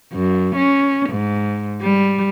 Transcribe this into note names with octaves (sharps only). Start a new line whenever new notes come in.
F#2
C#4
G#2
G3